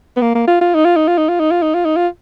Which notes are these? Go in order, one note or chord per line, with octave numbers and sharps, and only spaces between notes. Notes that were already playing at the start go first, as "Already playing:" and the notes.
B3
A#3
A#3
F4
F4
D#4
F4
D#4
F4
D#4
F4
D#4
F4
D#4
F4
D#4
F4